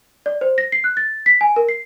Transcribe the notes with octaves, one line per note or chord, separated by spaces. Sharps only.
D5
C5
A#6
C7
F#6
A6
B6
G#5
A#4
C7